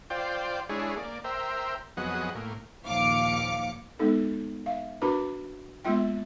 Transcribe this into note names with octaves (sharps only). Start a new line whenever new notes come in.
F4 C5 D5 G5
G#3 D4 E4 G#4 C#5
A#3 D5
A#4 C5 E5 G5
F2 F#3 B3 G#4 D#5 F#5
A2 A#3
A#1 D#2 F3 F5 D6 C#7
G#3 B3 D#4 A4
E5 F5
D4 F#4 A#4 B4 B5 D6
G#3 A#3 B3 F4 E5 G5